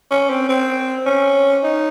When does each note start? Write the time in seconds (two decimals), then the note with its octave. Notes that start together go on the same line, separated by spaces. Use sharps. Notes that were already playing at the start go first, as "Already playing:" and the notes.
0.11 C#4
0.30 C4
0.49 C4
1.06 C#4
1.63 D#4